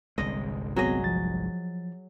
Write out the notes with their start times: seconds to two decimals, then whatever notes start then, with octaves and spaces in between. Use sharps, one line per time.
0.18 G1 C2 G#3 D#5
0.76 F#3 B3 C4 G#4 D#5
1.04 F3 A6